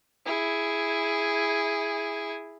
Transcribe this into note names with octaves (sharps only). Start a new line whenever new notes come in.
E4 G#4